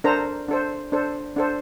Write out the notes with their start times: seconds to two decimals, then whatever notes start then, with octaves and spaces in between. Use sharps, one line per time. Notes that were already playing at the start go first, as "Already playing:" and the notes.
0.04 D4 A4 A#4 C5 A#5
0.48 D4 A4 C5
0.92 D4 A4 C5
1.36 D4 A4 C5